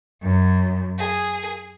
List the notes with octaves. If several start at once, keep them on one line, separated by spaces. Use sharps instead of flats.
F#2
G#4